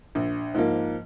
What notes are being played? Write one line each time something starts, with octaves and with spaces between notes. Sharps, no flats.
A#1
G#2 F3 A#3